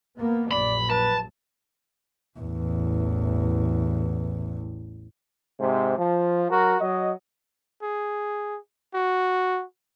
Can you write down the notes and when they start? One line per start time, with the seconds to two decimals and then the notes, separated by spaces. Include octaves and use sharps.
0.19 A#3 B3
0.51 A#1 F#2 D5 B5
0.90 B4 A5
2.40 A1 E2
5.60 G#2 C3
5.98 F3
6.50 F#3 F#4 A#4
6.81 F#3 D#5
7.82 G#4
8.94 F#4